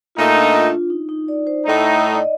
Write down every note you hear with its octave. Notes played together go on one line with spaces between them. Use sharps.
A#2 A3 D#4 F4
D4
F4
F4
D#4
D#4
D5
C5
A2 A3 D#4 D#5
D#5
D5
D#5